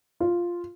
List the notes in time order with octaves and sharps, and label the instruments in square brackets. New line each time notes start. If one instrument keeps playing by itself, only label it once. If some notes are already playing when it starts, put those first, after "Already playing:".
[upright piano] F4